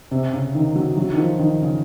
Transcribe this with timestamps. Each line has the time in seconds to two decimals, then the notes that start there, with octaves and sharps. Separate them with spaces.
0.11 C3
0.33 C#3
0.55 D#3
0.76 F#3
0.97 F#3
1.13 D#3
1.18 F3
1.39 D#3
1.62 C#3